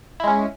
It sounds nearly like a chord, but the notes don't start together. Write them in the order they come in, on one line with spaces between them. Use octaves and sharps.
E4 G#3 C#4